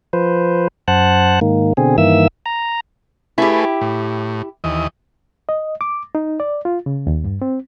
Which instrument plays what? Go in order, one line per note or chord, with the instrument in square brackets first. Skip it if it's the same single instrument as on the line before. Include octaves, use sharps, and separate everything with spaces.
[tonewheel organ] F3 B4 C5
F#2 C5 F#5 A5 F#6
G#2 D#3 A#3
B2 D3 C4 G#4
G2 D#3 E3 A#3 E5 E6
A#5
[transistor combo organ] A3 G#4 B4 [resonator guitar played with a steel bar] E4 G4
[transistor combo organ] A2
D#2 E3 D#5
[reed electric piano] D#5
D6
D#4
D5
F4
C#3
D#2
G2
C4